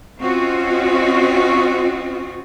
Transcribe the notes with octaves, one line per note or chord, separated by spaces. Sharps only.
C4 C#4 F4 F#4 D#5